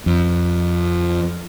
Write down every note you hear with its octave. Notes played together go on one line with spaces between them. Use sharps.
F2